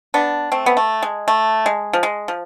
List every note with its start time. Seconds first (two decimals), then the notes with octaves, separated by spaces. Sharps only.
0.14 B3 D4
0.52 A3 C4
0.66 B3
0.77 A3
1.03 G#3
1.28 A3
1.66 G#3
1.93 F3
2.03 G#3
2.28 F3